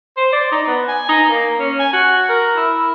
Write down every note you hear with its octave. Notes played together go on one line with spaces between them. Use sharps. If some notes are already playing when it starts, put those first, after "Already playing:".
C5
D5
D#4
B3
G#5
D#4
A#3
C#4
G#5
F#4
A#4
E4